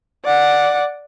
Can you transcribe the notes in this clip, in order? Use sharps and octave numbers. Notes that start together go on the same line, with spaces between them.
D5 F#5